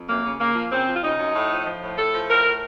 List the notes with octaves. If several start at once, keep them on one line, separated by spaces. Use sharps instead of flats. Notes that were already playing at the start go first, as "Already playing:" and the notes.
Already playing: F2
F#2 A#3
C#3
C#3 A#3
F3
C#3 C4
F3
F4
C#3 D#4
F#2
A2
F3
F3
A2
A2 A4
F3
A2 A#4
A2